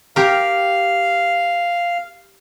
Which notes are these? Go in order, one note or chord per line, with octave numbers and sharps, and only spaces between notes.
G4 A#4 F5